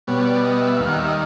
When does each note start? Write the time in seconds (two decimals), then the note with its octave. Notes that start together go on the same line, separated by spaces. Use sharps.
0.07 B2 G3 B3 C#5
0.25 D5
0.44 D#5
0.61 E5
0.80 D#2 D#3 G3 F5
0.89 F#5
0.98 E5
1.08 D#5